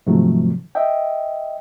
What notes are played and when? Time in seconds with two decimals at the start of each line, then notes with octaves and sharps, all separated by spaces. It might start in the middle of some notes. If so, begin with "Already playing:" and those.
0.07 G#2 C3 D#3 F3 F#3 A3
0.75 D#5 E5 G5